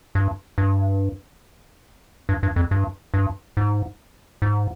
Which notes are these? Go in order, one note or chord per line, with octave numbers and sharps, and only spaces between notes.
G2
G2
G2
G2
F2
G2
G2
G#2
G#2